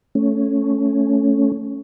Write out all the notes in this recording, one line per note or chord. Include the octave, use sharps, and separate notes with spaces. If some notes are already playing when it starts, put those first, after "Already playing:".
A3 C#4